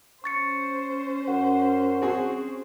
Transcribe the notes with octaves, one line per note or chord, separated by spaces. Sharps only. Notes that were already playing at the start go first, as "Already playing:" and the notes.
C#4 C5 C#6 A6 C#7
F#2 F#5
C4 F#4 G#4